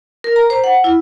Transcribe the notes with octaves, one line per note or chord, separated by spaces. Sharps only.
A#4
A#5
C5
F#5
E4